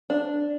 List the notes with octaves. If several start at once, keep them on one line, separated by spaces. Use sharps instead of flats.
D4